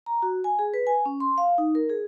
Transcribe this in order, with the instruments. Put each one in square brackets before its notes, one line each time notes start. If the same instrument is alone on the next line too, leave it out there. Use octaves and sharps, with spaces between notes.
[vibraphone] A#5
F#4
G#5
G#4
B4
G#5
C#4
C6
F5
D#4
A#4
G#4